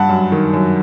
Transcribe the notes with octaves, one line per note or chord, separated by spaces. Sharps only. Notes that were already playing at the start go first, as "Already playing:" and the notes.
Already playing: G2 F#5 A5
F#2
D#3
F#2